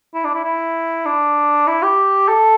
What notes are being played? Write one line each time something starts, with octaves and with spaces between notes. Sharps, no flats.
E4
D4
E4
E4
D4
E4
G4
A4